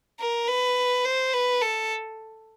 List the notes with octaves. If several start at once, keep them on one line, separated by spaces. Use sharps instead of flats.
A#4
B4
C5
B4
A4